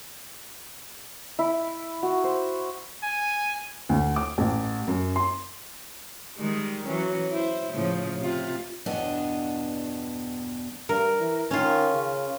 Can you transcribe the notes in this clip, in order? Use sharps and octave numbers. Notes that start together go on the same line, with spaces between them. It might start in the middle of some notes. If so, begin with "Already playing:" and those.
E4
F#4
C5
G#5
D2
D6
A1
F#2
C6
D#3 G3 G#3
E3 F#3 C#4
E4 C5
A2 C#3 F3
C3 F4
E2 G2 B2 B3 D4 D#5
G2 A#4
E3
D#3 C#4 F4
C#3